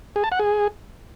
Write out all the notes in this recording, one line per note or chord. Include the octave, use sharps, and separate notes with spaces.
G#4
A5
F#5
G#4